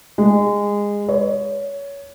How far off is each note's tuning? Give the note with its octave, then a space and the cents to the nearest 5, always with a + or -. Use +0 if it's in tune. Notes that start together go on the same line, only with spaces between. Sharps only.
G#3 -20
C#5 +20